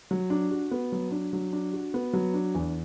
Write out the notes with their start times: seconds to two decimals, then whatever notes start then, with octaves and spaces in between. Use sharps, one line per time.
0.11 F#3
0.30 D4
0.51 F#4
0.71 B3
0.92 F#3
1.11 D4
1.33 F#3
1.53 D4
1.73 F#4
1.94 B3
2.13 F#3
2.34 D4
2.55 E2